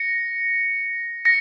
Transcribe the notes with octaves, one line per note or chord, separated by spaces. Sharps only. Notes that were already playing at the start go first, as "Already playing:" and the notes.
Already playing: A#6 C#7
A#6 C#7